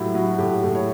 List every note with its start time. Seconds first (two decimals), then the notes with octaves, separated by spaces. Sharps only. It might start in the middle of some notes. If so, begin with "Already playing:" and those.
Already playing: A2 F#3 E4 G4
0.15 F#3 F#4
0.38 A2 G4
0.63 A2
0.75 C#5